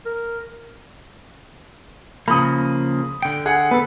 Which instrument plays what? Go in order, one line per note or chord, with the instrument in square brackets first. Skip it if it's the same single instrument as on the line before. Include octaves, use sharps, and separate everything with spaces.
[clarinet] A#4
[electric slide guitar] C#3 F3 A#3 [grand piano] B5 D#6
[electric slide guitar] D3 G5
[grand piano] G#4 F#5
[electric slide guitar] B3 A4 [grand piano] B4